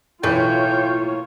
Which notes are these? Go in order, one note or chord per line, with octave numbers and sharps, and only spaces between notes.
B1 A2 E3 A#3 F4 C#5 G5